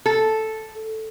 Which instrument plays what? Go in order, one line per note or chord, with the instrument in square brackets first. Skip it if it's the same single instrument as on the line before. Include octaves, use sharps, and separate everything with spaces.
[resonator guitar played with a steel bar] A4